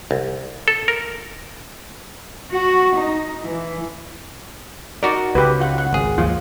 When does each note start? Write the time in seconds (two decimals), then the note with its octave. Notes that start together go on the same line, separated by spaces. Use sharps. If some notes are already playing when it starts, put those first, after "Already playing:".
0.11 C2
0.68 A4
0.88 A#4
2.50 F#4
2.95 D#4
3.42 E3
5.03 D#4 F#4 A#4 D5
5.35 C#2 G4 B4
5.60 F4 F#5
5.78 F#5
5.93 G#1 G#4
6.18 D#2 F3 F4